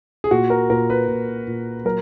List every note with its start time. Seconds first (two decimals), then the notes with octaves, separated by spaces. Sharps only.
0.24 G#4
0.31 A#2 F#4
0.50 A#4
0.70 A#2 A#4
0.90 B4
1.08 A#2
1.47 A#2
1.85 F#3 A#4